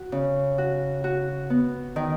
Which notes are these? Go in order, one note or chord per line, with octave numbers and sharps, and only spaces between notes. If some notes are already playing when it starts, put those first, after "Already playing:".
Already playing: F#4
C#3
F#4
F#4
B3
D#3